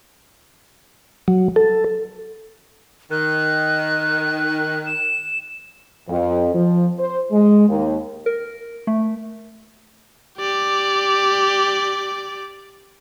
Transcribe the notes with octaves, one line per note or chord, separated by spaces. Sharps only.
F#3
A4
D#3 F#6
E7
F2
F3
C5
G#3
D#2
A#4
A3
G4 D5